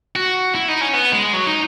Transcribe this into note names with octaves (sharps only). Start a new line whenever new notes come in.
F#4
E4
D#4
C#4
B3
G#3
F#3
D#4